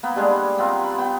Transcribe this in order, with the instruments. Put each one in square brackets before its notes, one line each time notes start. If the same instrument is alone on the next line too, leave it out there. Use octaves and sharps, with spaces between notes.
[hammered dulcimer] A#3 B3
G3 G#3 D4 G#4
B3 C4 F4 A#4
B5
B3 G5